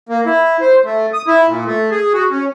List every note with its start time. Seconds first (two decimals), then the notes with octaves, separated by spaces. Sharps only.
0.09 A#3
0.26 E4
0.61 C5
0.85 A3
1.13 D#6
1.27 E4
1.48 A#2
1.66 A3
1.91 G#4
2.13 F#4
2.31 C#4